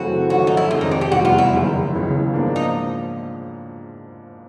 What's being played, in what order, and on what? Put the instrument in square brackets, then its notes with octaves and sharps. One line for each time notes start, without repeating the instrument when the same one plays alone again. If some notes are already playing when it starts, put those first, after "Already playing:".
Already playing: [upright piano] F#2 C#3 E3 A3 C4 [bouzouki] F#4
[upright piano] G#1 G#2 F3 A3 C#4 [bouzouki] F#4
[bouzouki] D#4
E4
[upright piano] F2 C3 D#3 G#3 [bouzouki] F4
[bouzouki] D#4
D4
G4
[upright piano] F1 E2 B2 G3 [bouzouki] F#4
[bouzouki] F4
E4
[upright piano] F#1 F#2 D#3
C#2 C#3 E3 G#3 B3
G#2 F3 A#3 D4
[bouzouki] D#4